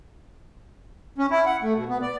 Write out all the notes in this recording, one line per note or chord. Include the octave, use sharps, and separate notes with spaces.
C#4
E4
F#5
A3
B2
B3
D5